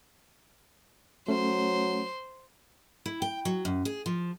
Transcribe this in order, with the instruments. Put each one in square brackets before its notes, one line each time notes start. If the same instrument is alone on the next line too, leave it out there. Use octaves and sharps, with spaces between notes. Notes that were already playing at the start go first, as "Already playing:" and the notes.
[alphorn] F#3 [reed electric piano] A3 C#4 [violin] C5
[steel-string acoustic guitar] E4
G5
F#3
F#2
G#4
F3